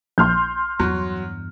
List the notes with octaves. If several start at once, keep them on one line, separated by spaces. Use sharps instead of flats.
A#1 C6 F6 G6
E2 G2 F#3